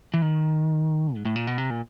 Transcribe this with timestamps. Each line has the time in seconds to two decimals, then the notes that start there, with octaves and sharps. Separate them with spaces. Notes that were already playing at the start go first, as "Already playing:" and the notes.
0.14 E3
0.22 D#3
1.15 G#2
1.25 A2
1.36 A#2
1.47 B2
1.58 C3
1.70 A#2